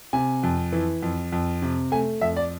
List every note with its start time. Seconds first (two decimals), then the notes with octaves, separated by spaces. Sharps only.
0.13 C3 G#5
0.43 F2
0.72 E3
1.02 F2
1.32 F2
1.62 C3
1.92 A3 G#5
2.21 F2 E5
2.36 D5